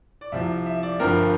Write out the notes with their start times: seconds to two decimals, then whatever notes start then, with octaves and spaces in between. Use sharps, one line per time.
0.21 D5
0.32 C2 C3 F3 C4 E5
0.66 E5
0.83 D5
1.00 G1 G2 F3 C4 A#4